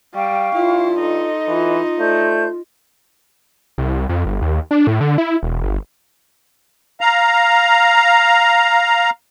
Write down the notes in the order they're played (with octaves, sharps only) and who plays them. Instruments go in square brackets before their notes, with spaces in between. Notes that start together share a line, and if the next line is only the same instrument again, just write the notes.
[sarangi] G3 [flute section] F5 G5 C#6
[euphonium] G2 [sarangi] E4 [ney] F4
[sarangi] D#4 [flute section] A4 D#5 C6
[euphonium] E3 [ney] F4
[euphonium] A3 [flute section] C5 D5 G6
[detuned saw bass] C2
F2
G1
D#2
D4
A2
D3
E4
E1
G1
[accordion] F5 A#5